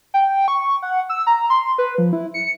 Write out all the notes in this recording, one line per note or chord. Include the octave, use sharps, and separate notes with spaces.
G5
C#6
F#5
E6
A#5
C6
B4
F3
E4
C#7